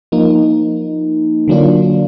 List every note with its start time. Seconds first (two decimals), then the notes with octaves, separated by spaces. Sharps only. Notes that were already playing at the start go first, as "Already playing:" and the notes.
0.12 F3 A#3 D#4
1.48 D3 F#3 A#3 D4 F4